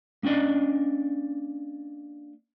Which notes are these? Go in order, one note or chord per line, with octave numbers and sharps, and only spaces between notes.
A#3 C#4 D4 D5 D#5